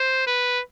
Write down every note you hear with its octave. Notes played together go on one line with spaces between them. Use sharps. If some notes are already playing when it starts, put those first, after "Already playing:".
Already playing: C5
B4